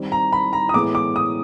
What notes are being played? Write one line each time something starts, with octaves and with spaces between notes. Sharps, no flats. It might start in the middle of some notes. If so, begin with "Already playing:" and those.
Already playing: D#3 G3 C4
A#5
B5
A#5
D#6
A2 E3 G#3 B3 E4 D6
D6
D#6